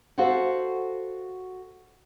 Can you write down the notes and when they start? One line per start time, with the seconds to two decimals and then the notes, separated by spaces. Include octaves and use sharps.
0.18 F#4 A4 C5 F5 F#5